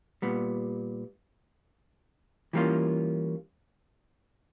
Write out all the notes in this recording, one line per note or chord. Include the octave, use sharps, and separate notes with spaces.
A#2 G3 B3
E3 G3 A#3 C#4 F4